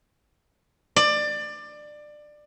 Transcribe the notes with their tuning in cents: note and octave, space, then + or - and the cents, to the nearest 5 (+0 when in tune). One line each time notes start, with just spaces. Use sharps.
D5 +20